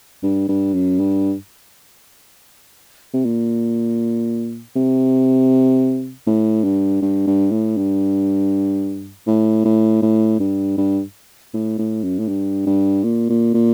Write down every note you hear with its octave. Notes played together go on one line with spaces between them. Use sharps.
G2
G2
F#2
G2
C3
A#2
C3
A2
G2
G2
G2
A2
G2
A2
A2
A2
G2
G2
A2
A2
F#2
A2
G2
G2
A#2
A#2
A#2